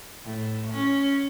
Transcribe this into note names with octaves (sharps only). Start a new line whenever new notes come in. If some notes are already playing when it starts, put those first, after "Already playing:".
A2
C#4